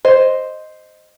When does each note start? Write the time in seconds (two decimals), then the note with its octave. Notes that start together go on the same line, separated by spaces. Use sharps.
0.05 C5 D#5